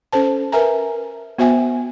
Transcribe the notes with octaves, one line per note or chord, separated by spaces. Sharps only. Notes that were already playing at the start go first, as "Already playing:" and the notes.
C#4 A4 C5 A5
A#4 B4 E5 G#5 A#5
B3 F#4 C5 E5 G5 G#5